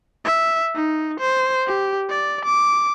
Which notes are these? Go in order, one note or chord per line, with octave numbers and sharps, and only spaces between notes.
E5
D#4
C5
G4
D5
D6